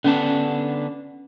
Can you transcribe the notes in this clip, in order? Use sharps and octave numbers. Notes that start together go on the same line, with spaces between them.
D3 B3 C#4 D4